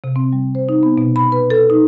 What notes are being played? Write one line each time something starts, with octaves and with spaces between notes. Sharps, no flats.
C3
C4
G3
C5
D#4
B3
B2
B5
B4
A4
D#4